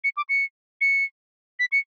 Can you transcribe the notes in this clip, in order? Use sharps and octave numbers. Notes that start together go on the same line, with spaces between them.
C#7
D6
C#7
C#7
B6
C#7